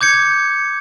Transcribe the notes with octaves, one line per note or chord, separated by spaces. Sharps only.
D6 G6 G#6 C#7